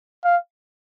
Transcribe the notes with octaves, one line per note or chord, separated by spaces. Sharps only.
F5